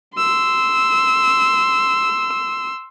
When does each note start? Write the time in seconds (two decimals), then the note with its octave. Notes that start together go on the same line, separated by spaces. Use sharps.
0.16 C6 E6